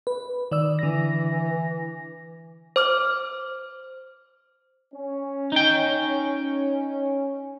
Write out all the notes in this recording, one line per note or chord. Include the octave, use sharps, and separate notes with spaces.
B4
D#3 D5 E6
D3 E3 A#6
C5 D6 F6
C#4
D#4 G5